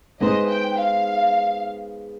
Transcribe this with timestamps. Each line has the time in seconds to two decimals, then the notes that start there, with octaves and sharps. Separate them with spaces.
0.20 G#3 B3 D#4 G#4 C5 D#5
0.49 G5
0.77 F5